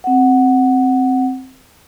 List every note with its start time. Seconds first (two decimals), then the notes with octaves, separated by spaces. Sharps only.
0.04 C4 F#5